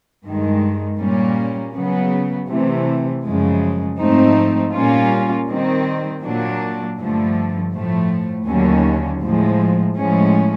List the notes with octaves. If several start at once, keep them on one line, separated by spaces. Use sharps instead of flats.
G2 D#3 G#3
A#2 G3 A#3 C#4
C#3 F#3 B3
C3 E3 A3
F#2 C#3 F3 G#3
G#2 F3 A3 C4 D#4
A#2 G3 A#3 C#4 F4
D#3 G3 C4
A#2 F#3 A#3 D4
G2 D3 F3 A3
A2 F3 A3
D#2 D3 F#3 A#3 C#4
A2 F3 G#3
A2 F3 G#3 C#4